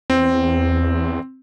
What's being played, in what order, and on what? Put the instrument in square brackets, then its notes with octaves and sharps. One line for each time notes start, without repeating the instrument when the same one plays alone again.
[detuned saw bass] E2 [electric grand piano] C4